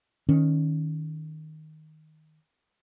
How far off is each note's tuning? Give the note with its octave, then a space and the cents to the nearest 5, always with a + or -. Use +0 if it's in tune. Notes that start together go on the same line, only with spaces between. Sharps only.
D#3 +0 C#4 +5